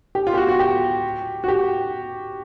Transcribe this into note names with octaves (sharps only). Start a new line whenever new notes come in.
G4
F4
G4
F#4
F#4
G4
F#4
G4